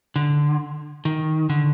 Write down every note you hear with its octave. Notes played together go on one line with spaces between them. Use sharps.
D3
D#3
D3